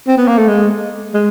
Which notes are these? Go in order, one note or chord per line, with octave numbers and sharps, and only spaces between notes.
C4
B3
A#3
A3
G#3
G#3